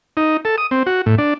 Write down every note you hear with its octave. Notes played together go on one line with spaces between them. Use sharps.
D#4
A4
D#6
C4
F#4
A2
D4